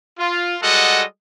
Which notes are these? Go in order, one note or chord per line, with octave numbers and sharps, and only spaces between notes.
F4
G3 G#3 F#4 A4 D#5 F#5